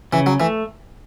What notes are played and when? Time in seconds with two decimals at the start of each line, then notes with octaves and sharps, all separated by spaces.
0.13 C#3 E3
0.26 F#3
0.40 E3 A3